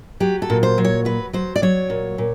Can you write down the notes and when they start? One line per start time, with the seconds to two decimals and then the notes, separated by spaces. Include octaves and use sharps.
0.20 F#3 G4
0.42 A4
0.50 A#2
0.63 C5
0.78 F#3
0.85 C#5
1.05 F#3 B4
1.33 F#3 C5
1.56 D5
1.62 F#3 C#5
1.90 A#2
2.18 A#2